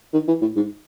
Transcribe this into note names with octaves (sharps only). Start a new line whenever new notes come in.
D#3
E3
A2
G#2